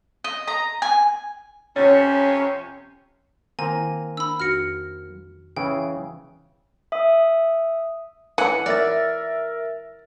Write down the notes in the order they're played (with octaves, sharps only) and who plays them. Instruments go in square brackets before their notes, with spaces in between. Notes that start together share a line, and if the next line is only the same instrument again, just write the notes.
[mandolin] D#5
A#5
G#5
[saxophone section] F2 C3 C#4 [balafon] C#5
[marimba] D#3 E4 [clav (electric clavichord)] A#3 C4 A#5 [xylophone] G#5
[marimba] D4 [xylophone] B5 E6
[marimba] F2 F#4 A#6 [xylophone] F6 C#7
[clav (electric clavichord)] C#3 E3 G#4 [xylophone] G5
[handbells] E5 D#6
[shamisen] E3 [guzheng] F#5
[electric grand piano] A#4 E5 A6 [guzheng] D5